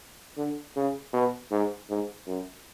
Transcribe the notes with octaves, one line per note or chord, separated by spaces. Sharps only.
D3
C#3
B2
G#2
G#2
F#2